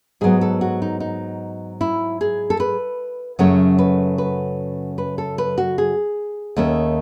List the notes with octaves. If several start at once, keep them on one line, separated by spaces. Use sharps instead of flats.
G#2 F#3 B3 G#4
A4
F#4
D#4
D#4
E4
G#4
A4
B4
F#2 C#3 F#3 A3 C#4 C#5
B4
B4
B4
A4
B4
F#4
G#4
D#2 D#3 A3 C#4